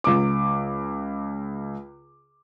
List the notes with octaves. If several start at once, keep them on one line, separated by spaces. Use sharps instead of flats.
C#2 D6